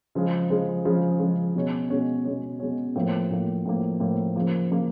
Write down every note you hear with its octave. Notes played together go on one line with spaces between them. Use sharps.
C#3 F3 G#3
C#3 F3 G#3
C#3 F3 G#3
C#3 F3 G#3
B2 G#3 C#4
B2 G#3 C#4
B2 G#3 C#4
B2 G#3 C#4
A2 F3 A#3
A2 F3 A#3
A2 F3 A#3
A2 F3 A#3
C#3 F3 A#3
C#3 F3 A#3